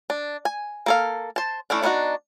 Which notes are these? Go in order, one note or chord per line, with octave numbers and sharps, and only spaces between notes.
D4
G#5
A#3 A4 F5
C5 A5
E3 A3 C#4 D4
B3 D4 D#4 F4 F#4